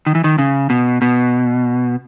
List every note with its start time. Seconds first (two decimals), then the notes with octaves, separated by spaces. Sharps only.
0.06 D#3
0.15 E3
0.24 D#3
0.38 C#3
0.70 B2
1.02 B2